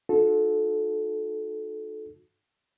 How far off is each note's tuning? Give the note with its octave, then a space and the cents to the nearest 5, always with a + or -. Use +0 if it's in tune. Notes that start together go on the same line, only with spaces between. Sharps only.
D#4 -35 F#4 -45 A4 -15